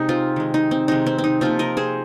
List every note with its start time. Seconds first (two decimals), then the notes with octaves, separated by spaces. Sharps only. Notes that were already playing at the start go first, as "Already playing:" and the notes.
Already playing: C3 G#3 D#4
0.09 C4 F4
0.36 D#3 G#3
0.54 D#4
0.71 C4
0.88 C3 D#3 G#3 D#4
1.06 C4
1.18 C4
1.24 D#4
1.41 C3 F3 A#3 C4 F4
1.59 A#4 D#5
1.77 G#4 C5